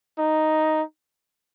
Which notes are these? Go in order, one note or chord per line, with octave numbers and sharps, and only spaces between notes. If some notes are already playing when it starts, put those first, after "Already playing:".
D#4